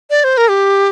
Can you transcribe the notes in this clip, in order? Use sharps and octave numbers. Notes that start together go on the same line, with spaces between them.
D5
C5
A#4
G4